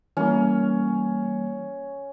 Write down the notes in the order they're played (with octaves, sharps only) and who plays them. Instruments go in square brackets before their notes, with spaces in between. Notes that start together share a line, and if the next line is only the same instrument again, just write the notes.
[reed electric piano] E3 G3 A#3 [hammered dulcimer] C#4